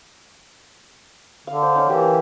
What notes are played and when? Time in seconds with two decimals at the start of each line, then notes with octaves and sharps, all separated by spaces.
1.47 D3 F5
1.63 C5
1.75 C#4 D#4
1.90 E3 A#3 G4